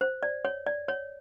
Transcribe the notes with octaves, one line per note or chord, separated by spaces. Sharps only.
C5
D5
C#5
D5
C#5